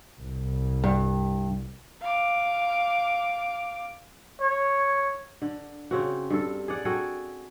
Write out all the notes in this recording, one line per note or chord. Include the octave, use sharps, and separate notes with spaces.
C2
G2
F5 D6
C#5
D3
C#3 C4 F#4
G2 A4
G#4 D5 F#5
F#4 G#4 A4 G5